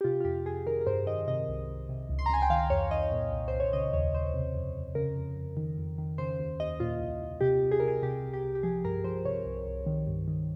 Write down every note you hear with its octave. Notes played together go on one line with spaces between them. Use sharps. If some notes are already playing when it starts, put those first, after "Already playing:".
G4
C3 F4
F4
F2 G4
F2 G#4
D#3 A#4
A#4
G2 C5
D#3 D#5
C3 D#5
C2
C2
C3
C#2
C6
A#5
C#2 G#5
G5
D#3 F5
F2 C#5
D#3 D#5
A#2
C2
C2 C5
C#5
C#3 D#5
D#2 C#5
D#2 C5
C3
F2
F2
C#3 A#4
F2
F2
D#3
F2
D#3
C#3 C5
D#2
D#2 D#5
A#2 F4
C2
C2
C3 G4
C2
G#4
C2 A#4
G#4
C3 G4
C2
G4
C2
G4
F3 G#4
G2 A#4
F3 C5
C3 C#5
C2
C2
D#3
G2
D#3